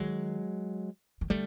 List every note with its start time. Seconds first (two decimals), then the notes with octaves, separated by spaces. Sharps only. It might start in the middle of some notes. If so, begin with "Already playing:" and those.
Already playing: D#3 F#3 G#3
1.21 D#3
1.30 D3 G3 A3